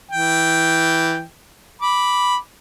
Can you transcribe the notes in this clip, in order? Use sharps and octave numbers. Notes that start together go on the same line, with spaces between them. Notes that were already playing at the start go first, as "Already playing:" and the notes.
E3 G5
B5 D6